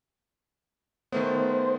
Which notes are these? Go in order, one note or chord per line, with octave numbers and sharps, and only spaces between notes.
D#3 A3 B3 C5